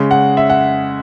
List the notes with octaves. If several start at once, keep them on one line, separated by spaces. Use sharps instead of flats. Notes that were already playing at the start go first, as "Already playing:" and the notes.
Already playing: C#3 G#3
F#5
E5
F#5